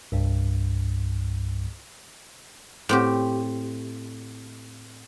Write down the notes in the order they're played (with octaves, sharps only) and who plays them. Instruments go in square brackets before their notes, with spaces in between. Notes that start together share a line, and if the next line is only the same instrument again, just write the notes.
[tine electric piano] C2 G2
[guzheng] A2 C4 G4